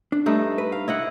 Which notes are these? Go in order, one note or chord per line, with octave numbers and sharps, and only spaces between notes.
D4
G2 A3 D#4
B4
F5
E4 D#5 F#5